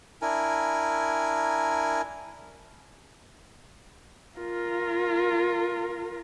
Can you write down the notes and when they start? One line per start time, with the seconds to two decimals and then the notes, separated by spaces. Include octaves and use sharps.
0.22 D4 E4 A#4 G#5
4.38 F4 A#4